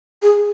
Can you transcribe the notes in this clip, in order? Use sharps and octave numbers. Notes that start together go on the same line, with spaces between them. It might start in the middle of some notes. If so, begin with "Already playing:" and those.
G#4